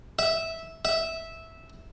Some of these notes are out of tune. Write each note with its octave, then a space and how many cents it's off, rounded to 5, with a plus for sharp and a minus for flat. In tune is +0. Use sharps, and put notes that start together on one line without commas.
E5 -10
E5 -10